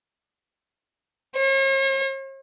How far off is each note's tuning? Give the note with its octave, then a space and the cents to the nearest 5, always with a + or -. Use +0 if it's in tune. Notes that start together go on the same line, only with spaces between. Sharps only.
C#5 -45